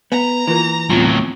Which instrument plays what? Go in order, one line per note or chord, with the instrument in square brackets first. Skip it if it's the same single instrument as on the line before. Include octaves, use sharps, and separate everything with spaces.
[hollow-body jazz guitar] B3 [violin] A#5
[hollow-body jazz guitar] E3 [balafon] A#3 F4 A#4
[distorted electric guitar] A2 F#3 [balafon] B3 C4 F4